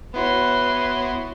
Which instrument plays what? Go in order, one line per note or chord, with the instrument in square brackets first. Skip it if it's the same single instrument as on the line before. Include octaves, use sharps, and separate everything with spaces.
[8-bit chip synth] B3 E4 F#4 [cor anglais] B4 [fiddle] C#5 C6